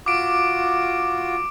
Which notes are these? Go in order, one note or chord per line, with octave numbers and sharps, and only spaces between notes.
F4 F#4 D6 D7